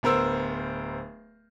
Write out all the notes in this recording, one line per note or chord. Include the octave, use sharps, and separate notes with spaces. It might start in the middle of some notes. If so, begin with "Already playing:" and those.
D1 B3 A#4 C5 E6